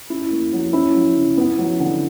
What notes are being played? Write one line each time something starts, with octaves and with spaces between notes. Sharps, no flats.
C#4 E4
A#3
F#3
C#4 E4
F#3
C#3
B3
F#3
D3